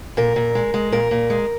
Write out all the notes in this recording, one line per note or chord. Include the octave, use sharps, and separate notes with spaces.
A#2 A#4
A#2
G#3
G#3
A#2 A#4
A#2
G#3